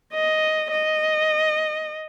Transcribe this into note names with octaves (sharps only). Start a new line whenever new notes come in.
D#5
D#5